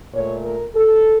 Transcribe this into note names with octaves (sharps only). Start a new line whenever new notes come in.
A#2 A3 C#5
A#4
A4